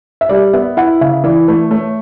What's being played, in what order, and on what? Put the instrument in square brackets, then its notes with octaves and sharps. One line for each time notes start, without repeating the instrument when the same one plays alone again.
[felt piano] E5
[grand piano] G3 [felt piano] D5
[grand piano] B3 [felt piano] E5
[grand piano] E4 [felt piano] F#5
[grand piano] C#3 [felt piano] E5
[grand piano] E3 [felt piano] D5
[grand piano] A3 [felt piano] B4
[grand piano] A3 [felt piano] C#5